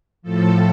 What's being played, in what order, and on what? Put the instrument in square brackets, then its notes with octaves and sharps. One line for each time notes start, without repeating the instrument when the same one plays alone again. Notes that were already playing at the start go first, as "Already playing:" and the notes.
[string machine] A2 F3 A4